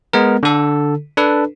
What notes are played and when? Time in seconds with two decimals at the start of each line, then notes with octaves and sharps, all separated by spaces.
0.13 G#3 B3 A#4
0.43 D3 A4
1.17 D4 A4 B4